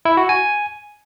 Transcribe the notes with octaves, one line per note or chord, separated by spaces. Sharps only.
E4
F#4
G#5